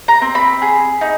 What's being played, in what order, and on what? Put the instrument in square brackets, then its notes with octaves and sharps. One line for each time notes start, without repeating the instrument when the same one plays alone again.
[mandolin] A#5
C4
B5
G#4
D#4